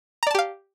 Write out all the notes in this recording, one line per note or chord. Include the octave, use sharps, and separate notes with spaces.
G4 D5 F5 A5 A#5